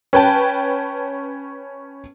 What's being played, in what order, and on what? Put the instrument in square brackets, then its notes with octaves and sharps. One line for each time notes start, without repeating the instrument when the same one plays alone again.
[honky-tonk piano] C#4 B4 G5 A5